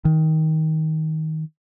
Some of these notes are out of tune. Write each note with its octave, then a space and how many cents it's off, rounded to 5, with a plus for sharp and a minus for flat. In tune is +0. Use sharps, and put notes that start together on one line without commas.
D#3 +20